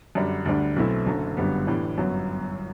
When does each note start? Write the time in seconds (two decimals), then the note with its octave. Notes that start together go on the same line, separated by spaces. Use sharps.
0.15 F#2 D3 G3 D4
0.46 D2 D3 G3 D4
0.76 B1 B2 A3 C4 E4
1.06 F#1 F#2 D3 A3
1.37 G1 F#2 D3 G3 B3
1.67 A2 E3 G3 D4
1.97 G1 F#2 F#3 B3